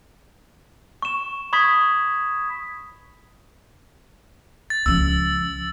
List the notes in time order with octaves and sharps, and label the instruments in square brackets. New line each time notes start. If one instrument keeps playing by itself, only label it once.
[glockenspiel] C#6 E7
B5 C#6 D#6 G#6 B6
[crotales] A6
[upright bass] C#2 F3 [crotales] E6